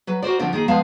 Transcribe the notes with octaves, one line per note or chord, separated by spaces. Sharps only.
F#3 B4
F#4 A#4 C5 D5
D2 D3 F3 C4 D4
D#3 A#3 G#4
F3 G#3 B3 F5 A5